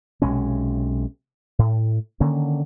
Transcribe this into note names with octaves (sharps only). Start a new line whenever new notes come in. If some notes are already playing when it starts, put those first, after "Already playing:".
B1 C3 G#3 C#4
A2
D3 D#3 A#3 C#4